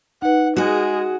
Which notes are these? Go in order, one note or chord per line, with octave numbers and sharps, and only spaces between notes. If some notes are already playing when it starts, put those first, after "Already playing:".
D#4 B4 F#5
G#3 F#4 G#4